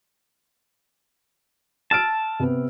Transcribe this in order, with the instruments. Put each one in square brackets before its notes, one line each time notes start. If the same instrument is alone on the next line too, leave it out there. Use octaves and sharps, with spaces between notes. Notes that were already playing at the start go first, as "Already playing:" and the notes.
[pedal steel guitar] A5 [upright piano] E6 F6 D7
[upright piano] C3 B3